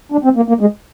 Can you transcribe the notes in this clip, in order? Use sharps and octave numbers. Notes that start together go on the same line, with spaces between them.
D4
C4
A#3
A#3
G#3